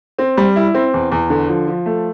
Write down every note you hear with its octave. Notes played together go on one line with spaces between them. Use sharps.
C4
G3
E4
C4
E2
E2
D3
F3
F3
A3